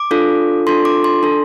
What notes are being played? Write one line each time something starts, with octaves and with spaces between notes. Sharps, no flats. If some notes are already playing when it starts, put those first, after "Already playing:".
Already playing: D6
D4 F4 A4
D4 F4 A4 C6
D6
C6
D4 A4